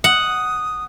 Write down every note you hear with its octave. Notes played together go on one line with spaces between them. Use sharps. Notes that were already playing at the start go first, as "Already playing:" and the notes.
F#5 D#6